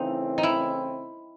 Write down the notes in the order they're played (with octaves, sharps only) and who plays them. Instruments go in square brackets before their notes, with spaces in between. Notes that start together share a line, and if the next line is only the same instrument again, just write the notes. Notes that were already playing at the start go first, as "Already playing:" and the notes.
Already playing: [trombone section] C#3 E3 A3 C4 [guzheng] D#4
[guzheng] D#4
E4